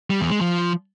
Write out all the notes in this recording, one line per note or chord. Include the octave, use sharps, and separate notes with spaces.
G3
E2
G#3
F3